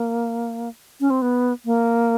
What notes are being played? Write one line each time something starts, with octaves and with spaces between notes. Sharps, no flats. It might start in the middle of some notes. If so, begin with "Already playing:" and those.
Already playing: A#3
C#4
C4
B3
A#3